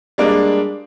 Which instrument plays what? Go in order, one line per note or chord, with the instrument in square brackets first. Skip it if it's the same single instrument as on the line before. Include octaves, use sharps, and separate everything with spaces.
[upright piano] G3 G#3 A#3 D4